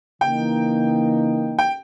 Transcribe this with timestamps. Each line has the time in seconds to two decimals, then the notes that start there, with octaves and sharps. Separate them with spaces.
0.21 C#3 E3 A#3 D#4 G5
1.59 G5